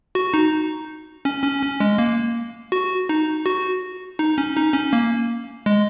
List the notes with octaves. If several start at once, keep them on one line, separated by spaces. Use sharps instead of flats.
F#4
D#4
C#4
C#4
C#4
G#3
A#3
F#4
D#4
F#4
D#4
C#4
D#4
C#4
A#3
G#3